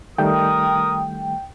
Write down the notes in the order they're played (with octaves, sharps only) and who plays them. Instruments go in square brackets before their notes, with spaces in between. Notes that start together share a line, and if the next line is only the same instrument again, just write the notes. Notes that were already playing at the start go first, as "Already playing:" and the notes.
[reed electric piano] D#3 G3 A3 [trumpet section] A#4 D#6 [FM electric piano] G5